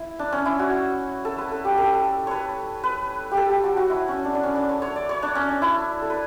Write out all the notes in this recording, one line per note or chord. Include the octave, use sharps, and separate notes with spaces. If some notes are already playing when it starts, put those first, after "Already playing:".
Already playing: E4
D4
C#4
E4
F#4
A4
B4
A4
G4
A4
B4 C#5
B4
G4
A4
G4
F#4
F#4
E4
C#4
D4
D4
C#4
D4
C#5
C#5
D5
C#5
D4
C#4
D4
E4
A4
B4